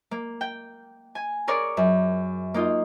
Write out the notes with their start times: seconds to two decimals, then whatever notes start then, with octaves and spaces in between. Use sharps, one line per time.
0.11 A#3
0.41 G5
1.15 G#5
1.48 G#4 A#4 C#5 D5
1.77 F#2
2.54 A#3 D#4 F4